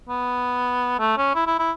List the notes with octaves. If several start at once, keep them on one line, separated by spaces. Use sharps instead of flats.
B3
A3
C#4
E4
E4
E4